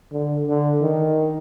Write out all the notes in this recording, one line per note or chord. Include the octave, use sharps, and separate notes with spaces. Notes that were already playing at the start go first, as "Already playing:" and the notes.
D3
D3
D#3